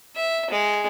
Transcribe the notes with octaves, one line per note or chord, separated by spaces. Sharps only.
E5
G#3